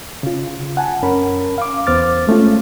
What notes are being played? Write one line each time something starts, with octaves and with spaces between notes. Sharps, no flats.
C#3 F4
F#5 G#5 A5
F#2 C#4 A#4 B5
F5 D6
E2 B3 C5 D6 F6 A6
G#3 A3 C#4 F4